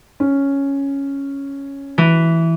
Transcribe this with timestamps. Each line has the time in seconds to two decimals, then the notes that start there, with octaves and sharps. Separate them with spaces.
0.20 C#4
1.98 E3